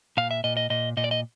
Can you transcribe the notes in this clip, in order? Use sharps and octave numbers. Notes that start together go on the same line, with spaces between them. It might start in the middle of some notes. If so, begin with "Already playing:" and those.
A#2 F5
E5
A#2 D#5
D#5
A#2 D#5
A#2 D#5
D5
D#5